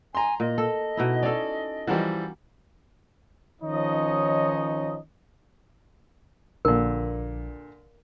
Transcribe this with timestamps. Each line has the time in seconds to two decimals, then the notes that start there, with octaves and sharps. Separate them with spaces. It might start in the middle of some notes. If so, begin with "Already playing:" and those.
0.15 G#5 A#5 C6
0.40 A#2 D#5
0.58 A4
0.97 B2 D#4 E4
1.23 C#4 A4 D5
1.87 E3 F3 G3 F#4 A#4
3.62 D#3 F3 C#4 D#4 C#5 D#5
6.65 A#1 A#2 D3 A#4